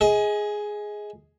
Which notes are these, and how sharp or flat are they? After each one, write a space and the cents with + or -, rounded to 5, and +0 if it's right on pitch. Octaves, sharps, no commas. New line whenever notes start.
G#4 +5 D#5 +30